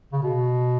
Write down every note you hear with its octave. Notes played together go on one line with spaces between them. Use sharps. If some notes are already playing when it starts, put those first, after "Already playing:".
C#3
B2